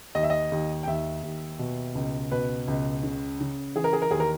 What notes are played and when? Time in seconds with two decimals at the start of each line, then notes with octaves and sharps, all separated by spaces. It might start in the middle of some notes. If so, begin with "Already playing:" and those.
0.15 D#2 D#5
0.23 E5
0.30 D#5
0.52 D#2
0.83 G5
0.87 D#2 E5
1.23 D#2
1.59 B2
1.95 C#2
2.31 B2 B4
2.68 C#2
3.03 C#3
3.41 C#3
3.75 E3 G#4
3.84 A#4
3.93 G#4
4.02 A#4
4.11 D#2 G#4
4.20 A#4